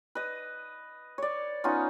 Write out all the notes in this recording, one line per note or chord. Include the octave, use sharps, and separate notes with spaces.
B4 D#5
C#5 D5
B3 C#4 D#4 F4